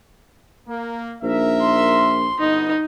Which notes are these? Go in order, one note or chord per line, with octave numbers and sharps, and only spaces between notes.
A#3
A#1 D#4 A#4 E5
C6
G1 B3 D#4 D#5